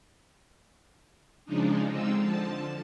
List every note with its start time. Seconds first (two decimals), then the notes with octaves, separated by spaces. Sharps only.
1.45 C#3 F3 G#3 D4 D#4
1.88 D3 G#3 C4 D#4 F4 E6
2.21 D3 F3 A5